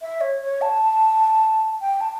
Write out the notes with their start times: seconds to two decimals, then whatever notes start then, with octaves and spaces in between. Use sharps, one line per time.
0.02 E5
0.21 C#5
0.41 C#5
0.61 A5
1.81 G5
2.01 A5